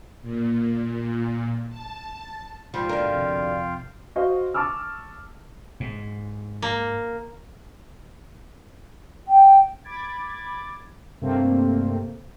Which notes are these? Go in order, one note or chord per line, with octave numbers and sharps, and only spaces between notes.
A#2
A5
G#2 F3 G3 F4 F5 G5
B2 D3 A#4
F2 C3
F#4 C5 D#5 F5
A5 C#6 D6 E6 F6
G#2
A#3
G5
B5 D6 G#6 A6
G2 C3 A3 A#3 C4